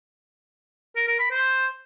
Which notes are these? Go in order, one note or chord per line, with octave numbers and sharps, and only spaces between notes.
A#4
A#4
B5
C5